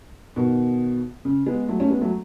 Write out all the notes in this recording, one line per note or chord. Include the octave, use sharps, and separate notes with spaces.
B2 D#3
C#3
G#3 B3
F#3 A3
A3 C#4
G#3 B3
F#3 A3